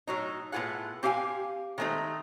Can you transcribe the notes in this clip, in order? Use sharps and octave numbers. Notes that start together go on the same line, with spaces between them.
A2 F#3 D#4
A2 B3 F4 G#4 F#5
C4 G4 F5 F#5 G#5
D#3 G#3 A3 C4 D#4